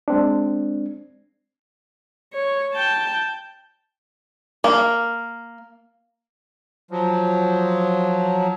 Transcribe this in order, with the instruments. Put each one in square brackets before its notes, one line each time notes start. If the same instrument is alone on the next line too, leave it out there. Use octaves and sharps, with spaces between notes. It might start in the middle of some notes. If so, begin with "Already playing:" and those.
[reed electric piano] G#3 C4 D4
[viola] C#5
G5 A5
[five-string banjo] A#3
[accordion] F3 F#3